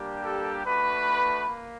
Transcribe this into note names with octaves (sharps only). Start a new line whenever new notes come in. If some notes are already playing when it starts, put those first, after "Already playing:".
Already playing: G3 A#3 D4 G4
A4
A3 D4 F#4 B4
A#3